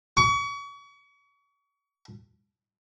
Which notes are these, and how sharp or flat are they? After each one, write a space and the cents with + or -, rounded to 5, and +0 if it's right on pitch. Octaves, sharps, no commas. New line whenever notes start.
C#6 +35